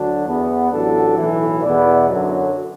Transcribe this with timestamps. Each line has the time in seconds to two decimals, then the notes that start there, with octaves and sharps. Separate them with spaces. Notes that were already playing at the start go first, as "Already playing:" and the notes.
Already playing: D2 D3 F#3 D4
0.26 E2 E3 B3
0.72 A1 A2 F#3 D4 A4
1.17 B1 A2 E3
1.63 E2 B2 B3 E4 D5
2.09 F#2 D3 F#3